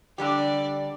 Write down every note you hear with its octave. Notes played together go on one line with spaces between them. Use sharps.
D3 G3 D4 G4 D5